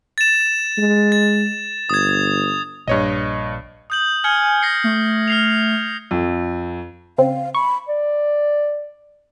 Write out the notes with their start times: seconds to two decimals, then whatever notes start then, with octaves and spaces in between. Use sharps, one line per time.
0.18 A6 E7
0.78 G#3
1.12 A6
1.90 G1 D#6 G#6
2.88 A#1 G2 C#5 D#5
3.90 D#6 G6 F#7
4.24 G#5 F6 G#6 C#7
4.62 A#6 C7 C#7
4.84 A3
5.28 F6 C7 F7
6.11 F2
7.18 C#3 C4 F5
7.54 B5 C#6
7.88 D5